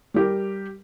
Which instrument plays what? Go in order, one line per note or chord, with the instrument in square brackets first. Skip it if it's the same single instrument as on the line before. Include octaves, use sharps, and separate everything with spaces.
[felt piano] G3 G4 A#4